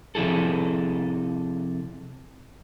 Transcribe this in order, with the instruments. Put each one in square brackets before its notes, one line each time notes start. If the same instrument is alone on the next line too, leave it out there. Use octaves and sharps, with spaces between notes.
[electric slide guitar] C3 F3 E4 G#4 A4